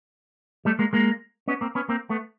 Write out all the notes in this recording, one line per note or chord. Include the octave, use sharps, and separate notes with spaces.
G3 A3
G#3 A#3
G#3 A#3
B3 C#4
A#3 C4
B3 C#4
A#3 C4
A3 B3